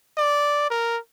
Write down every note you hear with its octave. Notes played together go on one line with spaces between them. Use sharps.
D5
A#4